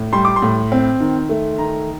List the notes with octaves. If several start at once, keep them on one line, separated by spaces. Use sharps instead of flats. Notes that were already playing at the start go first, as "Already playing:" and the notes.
Already playing: A2
G3 C6
D6
C6
A2
C4
D#3
A3
D#3 A#5